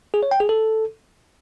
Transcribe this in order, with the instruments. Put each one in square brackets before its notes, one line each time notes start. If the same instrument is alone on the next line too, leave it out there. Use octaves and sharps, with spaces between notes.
[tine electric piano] G#4
C#5
G5
G#4
A4